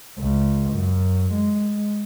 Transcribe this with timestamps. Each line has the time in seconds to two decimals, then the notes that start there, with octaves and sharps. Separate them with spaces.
0.19 C#2
0.73 F#2
1.33 G#3